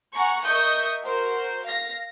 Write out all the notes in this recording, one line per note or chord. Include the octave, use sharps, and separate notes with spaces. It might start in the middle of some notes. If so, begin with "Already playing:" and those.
F#5 G#5 A#5 C#6
A#4 D#5 E5 C#6 D#6 G6
F#4 A#4 C5
F5 A#6